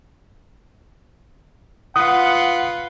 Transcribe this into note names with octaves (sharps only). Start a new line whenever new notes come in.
F4 B4 F#5 D#6